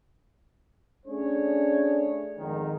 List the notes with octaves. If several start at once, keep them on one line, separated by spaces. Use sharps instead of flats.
A3 C#4 D4 G#4 C#5
F2 G#2 D#3